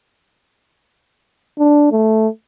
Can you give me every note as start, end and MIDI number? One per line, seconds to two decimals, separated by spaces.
1.59 1.89 62
1.92 2.28 57